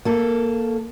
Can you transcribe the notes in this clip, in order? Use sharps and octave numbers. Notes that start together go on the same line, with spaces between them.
A#3 A4